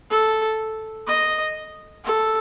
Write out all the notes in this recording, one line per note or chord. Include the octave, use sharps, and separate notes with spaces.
A4
D#5
A4